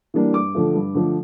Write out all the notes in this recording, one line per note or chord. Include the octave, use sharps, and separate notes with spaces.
E3 G3 A#3 D4
G2 D6
D3 F3 A3
G2
D3 F3 A3